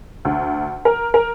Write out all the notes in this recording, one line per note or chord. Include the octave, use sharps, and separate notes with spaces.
D2
A#4
A#4